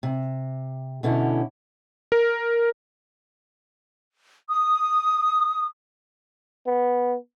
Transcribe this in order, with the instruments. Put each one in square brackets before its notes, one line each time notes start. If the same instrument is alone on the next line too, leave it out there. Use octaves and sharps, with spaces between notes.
[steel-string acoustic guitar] C3
B2 D3 C#4 E4
[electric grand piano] A#4
[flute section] D#6
[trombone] B3